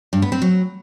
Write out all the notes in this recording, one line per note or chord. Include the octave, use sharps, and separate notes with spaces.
G2
B3
C4
F#3